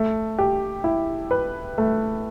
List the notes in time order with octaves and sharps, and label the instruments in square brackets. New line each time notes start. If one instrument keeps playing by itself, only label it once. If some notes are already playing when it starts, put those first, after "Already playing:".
Already playing: [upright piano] A3
G4
E4
B4
A3